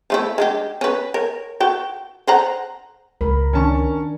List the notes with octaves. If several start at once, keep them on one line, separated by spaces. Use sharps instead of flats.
F3 A3 E4
G#3 D4 G4
C#4 B4
A#4 C#5
F#4 G5
C5 F#5 A#5
C#2 A#4 B5
D#3 C#4 D4 A5 C#6